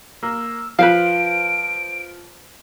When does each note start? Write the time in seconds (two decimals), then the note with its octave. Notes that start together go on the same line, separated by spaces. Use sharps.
0.23 A#3 E6
0.79 F3 B4 C5 F5 D7